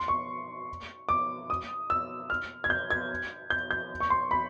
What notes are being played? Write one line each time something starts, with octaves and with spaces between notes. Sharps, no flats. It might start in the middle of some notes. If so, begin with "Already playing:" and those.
Already playing: C6
C#6
D6
D#6
E6
F6
G#6
G6
G#6
G6
G6
C#6
C6
B5